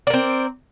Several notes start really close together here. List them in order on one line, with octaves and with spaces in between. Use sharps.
D5 A#4 C4